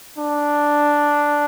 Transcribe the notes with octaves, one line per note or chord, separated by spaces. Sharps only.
D4